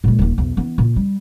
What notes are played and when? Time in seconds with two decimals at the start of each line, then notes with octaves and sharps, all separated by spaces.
0.04 A#2 G#3
0.19 D#1 D#2
0.38 B1 E2
0.57 E3 B3
0.78 A#2
0.96 G3